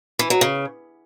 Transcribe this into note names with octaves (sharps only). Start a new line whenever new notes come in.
E3
F#3
C#3